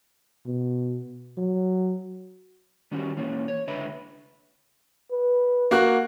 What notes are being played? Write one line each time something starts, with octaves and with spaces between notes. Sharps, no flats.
B2
F#3
D#3 G3 C#4 F#4
E3 A#3 C#4 C#5
C#5
C#2 D3 B4 D#5 E5 B5
B4
A#3 F#4 F#6